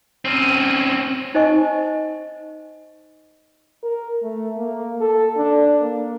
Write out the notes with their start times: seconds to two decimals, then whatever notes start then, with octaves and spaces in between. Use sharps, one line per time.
0.25 C4 C#4
1.34 D#4 C5 D#5 G#5 C#6
3.83 A#4
4.23 A3
4.57 A#3
5.01 A4
5.37 D4
5.81 A#3